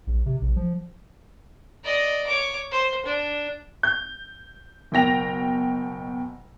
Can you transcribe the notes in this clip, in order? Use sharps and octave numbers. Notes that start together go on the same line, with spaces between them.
A#1
C3
A#1
F3
D5 D#5
C#5 D6
C5
D4
G6
F#1 B2 G5 A#6 F7